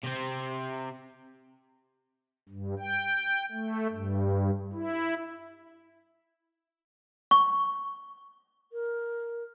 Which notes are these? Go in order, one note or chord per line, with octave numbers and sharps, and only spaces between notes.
C3 C4
G2
G5
A3
G2
E4
C#6
A#4